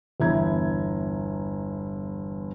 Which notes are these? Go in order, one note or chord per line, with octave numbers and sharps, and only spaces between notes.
G1 E2 E4 E5 A#5 G#6